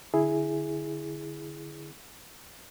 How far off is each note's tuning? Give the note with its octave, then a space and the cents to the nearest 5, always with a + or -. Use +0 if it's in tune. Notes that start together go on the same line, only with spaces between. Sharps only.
D3 +0 E4 +0 G#4 +0